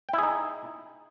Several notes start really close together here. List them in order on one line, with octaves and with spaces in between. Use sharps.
G5 E4 G#4 D#4